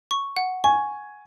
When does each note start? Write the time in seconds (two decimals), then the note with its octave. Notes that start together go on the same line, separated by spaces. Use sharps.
0.11 C#6
0.36 F#5
0.64 G#5 C#6